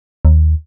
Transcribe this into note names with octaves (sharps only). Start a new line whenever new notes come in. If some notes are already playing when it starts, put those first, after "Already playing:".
D#2